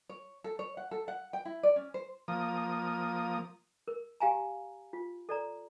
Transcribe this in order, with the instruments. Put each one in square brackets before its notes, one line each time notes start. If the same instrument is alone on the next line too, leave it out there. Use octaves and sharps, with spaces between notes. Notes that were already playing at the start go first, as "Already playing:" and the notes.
[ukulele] C#5
A4
C#5
F#5
A4
F#5
G5
E4
D5
C#4
C5
[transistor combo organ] F3 A#3 D#6
[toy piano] A#4
G4 F5 G#5 A#5
F4
A4 D5 A#5